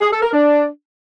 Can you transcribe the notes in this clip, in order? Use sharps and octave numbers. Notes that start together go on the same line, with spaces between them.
G#4
A4
A#4
D4